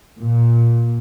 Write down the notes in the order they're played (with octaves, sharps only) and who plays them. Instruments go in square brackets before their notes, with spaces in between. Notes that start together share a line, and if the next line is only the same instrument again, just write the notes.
[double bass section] A#2